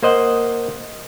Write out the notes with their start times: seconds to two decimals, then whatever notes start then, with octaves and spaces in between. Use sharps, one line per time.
0.03 A#3 C5 D#5 F#5